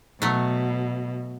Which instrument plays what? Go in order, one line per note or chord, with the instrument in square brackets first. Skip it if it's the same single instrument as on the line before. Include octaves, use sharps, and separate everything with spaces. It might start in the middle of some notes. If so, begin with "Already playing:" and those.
[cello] B2 [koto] F#3 A3